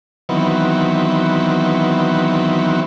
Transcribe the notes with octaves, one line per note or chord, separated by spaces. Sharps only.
D#3 E3 F#3 B3 C4